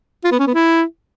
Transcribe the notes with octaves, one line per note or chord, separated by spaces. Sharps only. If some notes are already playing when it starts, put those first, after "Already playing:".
F4
B3
C#4
B3
E4